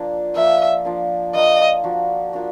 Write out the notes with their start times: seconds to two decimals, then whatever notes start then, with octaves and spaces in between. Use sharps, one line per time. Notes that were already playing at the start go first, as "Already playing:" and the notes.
Already playing: F3 A#3 D4
0.35 F3 A#3 D4 E5
0.85 F3 A#3 D4
1.34 F3 A#3 D4 D#5
1.84 F3 A#3 D4 F#4
2.33 F3 A#3 D4 F#4